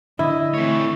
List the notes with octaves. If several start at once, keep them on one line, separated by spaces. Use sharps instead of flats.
D3 E4 D#5
E3 A3 C4 C#5